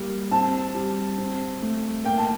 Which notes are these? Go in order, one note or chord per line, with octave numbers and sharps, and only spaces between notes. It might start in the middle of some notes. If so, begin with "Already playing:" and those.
Already playing: G3 A#3
C4 A5
G3
C4
A3
A#3 G5
A5